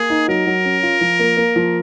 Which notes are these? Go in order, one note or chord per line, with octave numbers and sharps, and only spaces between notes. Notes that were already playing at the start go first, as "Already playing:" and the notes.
Already playing: A#3 G#4
D#4
F#3 A#4
F#3
C#4
F4
F3
A#3
A#3
F3